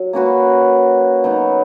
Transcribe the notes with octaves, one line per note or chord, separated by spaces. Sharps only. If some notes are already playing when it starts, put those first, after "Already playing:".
Already playing: F#3
A#3 C#4 F#4 B4
F#3 B3 D#4